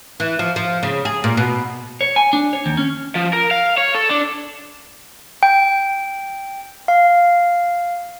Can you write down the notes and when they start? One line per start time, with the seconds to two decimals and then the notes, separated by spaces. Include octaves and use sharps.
0.20 E3
0.39 F3
0.56 F3
0.83 C#3
1.05 G#4
1.24 A#2
1.37 B2
2.01 C#5
2.16 G#5
2.33 D4
2.53 C#5
2.66 D#2
2.77 C#4
3.15 F3
3.33 A#4
3.51 F5
3.77 C#5
3.95 A4
4.11 D4
5.43 G5
6.88 F5